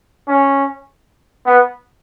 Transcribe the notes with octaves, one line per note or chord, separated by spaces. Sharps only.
C#4
B3